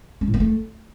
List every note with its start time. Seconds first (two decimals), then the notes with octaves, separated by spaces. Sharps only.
0.21 C#4
0.27 A2
0.34 A#3
0.40 A3